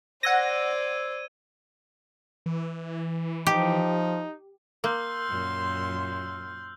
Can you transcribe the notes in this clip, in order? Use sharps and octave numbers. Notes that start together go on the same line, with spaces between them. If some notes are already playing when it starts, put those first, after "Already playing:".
C5 D5 F#5 E6 G#6 A#6 D#7
E3
F3 D#4 G4
A#3 C6 E6 F6 G6
F#2 A#2